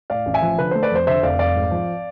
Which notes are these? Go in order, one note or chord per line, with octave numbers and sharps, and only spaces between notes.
A2 D5 F5
A1
E5 G#5
F3
D3 B4
A3 C5
B4 D5
F2 C5
D3 C5 E5
F1 D5 F5
F1 D5 F5
G#2
F3